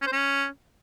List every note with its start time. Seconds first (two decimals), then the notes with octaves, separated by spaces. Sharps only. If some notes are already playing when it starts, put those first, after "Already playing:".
0.02 C#4
0.07 C5
0.12 C#4